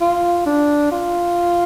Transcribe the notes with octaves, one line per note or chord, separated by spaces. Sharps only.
F4
D4
F4